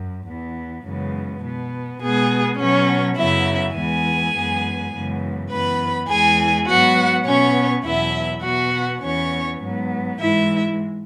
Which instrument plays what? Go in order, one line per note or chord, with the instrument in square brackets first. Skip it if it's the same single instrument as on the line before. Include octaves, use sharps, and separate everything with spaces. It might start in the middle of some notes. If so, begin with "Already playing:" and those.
Already playing: [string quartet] F#2
E2 E3 B3
F#2 C#3 E3 G#3 B3
B2 B3
B2 G#3 B3 G#4
B2 F#3 B3 C#4 C#5
F#2 C#3 F#3 B3 E4 E5
E2 E3 G#3 B3 G#4 G#5
F#2 E3 G#3 B3
F#2 C#3 E3 G#3 B3
F#2 E3 B3 B4 B5
E2 E3 G#3 G#4 G#5
G#2 F#3 B3 F#4 F#5
B2 B3 C#4 C#5
E2 B2 F#3 B3 E4 E5
B2 B3 F#4 F#5
E2 E3 B3 C#4 C#5
G#2 F#3 B3
G#2 E3 G#3 E4 E5